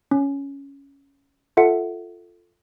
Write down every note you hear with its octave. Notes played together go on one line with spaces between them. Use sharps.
C#4
F4 A4 E5 F#5 C#7